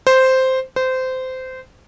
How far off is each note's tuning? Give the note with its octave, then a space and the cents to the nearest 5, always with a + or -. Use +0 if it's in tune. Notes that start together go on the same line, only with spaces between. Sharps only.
C5 -5
C5 -20